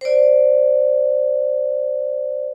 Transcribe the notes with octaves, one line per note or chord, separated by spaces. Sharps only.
C5 D5